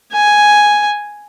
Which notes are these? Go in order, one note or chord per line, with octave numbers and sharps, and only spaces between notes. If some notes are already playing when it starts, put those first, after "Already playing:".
G#5